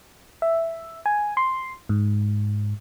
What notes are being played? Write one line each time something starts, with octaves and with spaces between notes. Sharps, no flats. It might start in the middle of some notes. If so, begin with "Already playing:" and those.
E5
G#5
C6
G#2